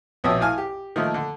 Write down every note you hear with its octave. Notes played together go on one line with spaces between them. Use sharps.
A#1 B2 C#5 E5 G5 D#6
A2 F5 G#5 F6
G4
D#3 F3 A3 A#3
D3